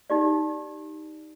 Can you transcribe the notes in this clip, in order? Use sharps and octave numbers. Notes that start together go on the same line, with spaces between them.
D#4 G4 D5